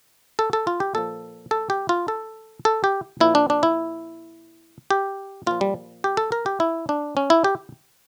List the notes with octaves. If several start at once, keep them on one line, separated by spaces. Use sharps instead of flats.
A4
A4
F4
G4
A#2 F3 A4
A4
G4
F4
A4
A4
G4
A#2 F3 E4
D4
D4
E4
G4
A#2 F3 F4
G3
G4
A4
A#4
G4
E4
D4
C#4
E4
G4